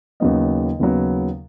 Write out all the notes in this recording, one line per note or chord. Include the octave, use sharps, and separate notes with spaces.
D#2 C#3 F#3 B3 D#5
D#2 C#3 F#3 B3